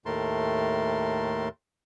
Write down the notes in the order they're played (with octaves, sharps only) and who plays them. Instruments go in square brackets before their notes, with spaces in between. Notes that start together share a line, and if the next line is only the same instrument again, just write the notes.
[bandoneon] D#2 A2 A3 A#4 A5 C6